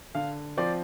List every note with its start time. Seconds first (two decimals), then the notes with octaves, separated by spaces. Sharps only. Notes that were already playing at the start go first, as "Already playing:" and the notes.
0.15 D3 F5
0.57 F3 C4 D5